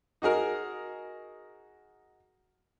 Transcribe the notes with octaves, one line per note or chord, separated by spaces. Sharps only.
D#4 F#4 G#4 A#4